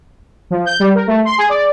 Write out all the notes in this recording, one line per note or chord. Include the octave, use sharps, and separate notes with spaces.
F3
G6
G3
A#4
A3
C6
G#4
D5